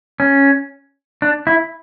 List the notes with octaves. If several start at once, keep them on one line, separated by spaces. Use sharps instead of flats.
C#4
D4
E4